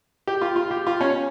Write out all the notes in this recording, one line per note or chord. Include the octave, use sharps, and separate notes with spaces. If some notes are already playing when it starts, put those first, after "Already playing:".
G4
F4
F4
G4
F4
C#4